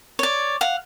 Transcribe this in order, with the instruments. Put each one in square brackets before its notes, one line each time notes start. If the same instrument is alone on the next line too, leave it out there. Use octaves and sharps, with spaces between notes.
[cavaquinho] C#5 D5
F5 F#5